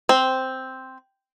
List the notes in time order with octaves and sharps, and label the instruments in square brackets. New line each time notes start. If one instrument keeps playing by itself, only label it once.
[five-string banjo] C4